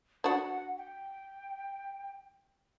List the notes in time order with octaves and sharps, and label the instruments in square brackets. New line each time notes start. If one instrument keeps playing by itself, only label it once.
[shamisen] D4 F#4 [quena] F#5
[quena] G5